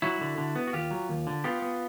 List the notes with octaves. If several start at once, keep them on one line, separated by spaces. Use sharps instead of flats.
F#3 E4 F#4
D3
D3
B3
F#4
D#2 F4 G4
F#3
D#2
D3
B3 F4 G4
B3